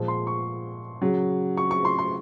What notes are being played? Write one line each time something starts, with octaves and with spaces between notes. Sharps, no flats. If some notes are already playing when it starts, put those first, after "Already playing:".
Already playing: A#2 F3 G#3
C6
C#6
C#3 F#3
C#6
C#6
C6
C6